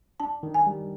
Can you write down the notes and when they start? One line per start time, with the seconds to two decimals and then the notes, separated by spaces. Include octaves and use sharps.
0.20 D4 A5
0.43 D#3
0.54 G#5
0.66 G3